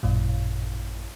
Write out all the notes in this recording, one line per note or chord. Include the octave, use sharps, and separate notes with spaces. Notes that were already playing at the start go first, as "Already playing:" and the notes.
A1 F#2 A#2